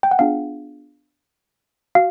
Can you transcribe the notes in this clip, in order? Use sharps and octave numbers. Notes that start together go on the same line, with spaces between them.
G5
F#5
B3 D4 F4 G#4 F5
F#4 F5